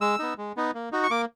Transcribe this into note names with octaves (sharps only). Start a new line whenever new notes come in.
G#3 E6
B3 D#4
G#3
B3 D#4
A#3
D#4 F#4
C#6
A#3 D6